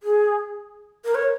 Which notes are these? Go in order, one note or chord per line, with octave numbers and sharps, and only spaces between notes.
G#4
A#4
C#5